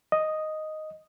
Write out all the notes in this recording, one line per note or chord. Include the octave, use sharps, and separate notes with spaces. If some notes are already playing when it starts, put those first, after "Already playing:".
D#5